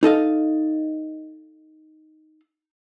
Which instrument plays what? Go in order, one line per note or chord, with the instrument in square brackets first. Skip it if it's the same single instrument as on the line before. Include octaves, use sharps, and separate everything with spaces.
[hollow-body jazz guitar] D#4 A4 D#5 F5